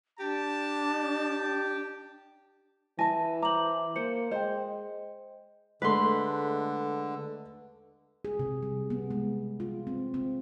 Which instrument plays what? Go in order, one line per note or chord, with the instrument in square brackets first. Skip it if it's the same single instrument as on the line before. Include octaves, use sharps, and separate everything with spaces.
[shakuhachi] D4 [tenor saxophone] G4 [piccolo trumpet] A5
[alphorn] E3 [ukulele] G#5 A5 [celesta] A#6
[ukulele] C5 A#5 [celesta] D6 F#7
[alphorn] A#3 [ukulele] C5 [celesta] C#7
[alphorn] G#3 [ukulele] C5 [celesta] D#5 G5
[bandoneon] D3 [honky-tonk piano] G#3 A3 [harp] B4 C6
[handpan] G#4
C3
G3
B3
G#3
F4
C4
C4